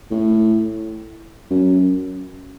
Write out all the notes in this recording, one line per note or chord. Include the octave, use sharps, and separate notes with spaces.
A2
F#2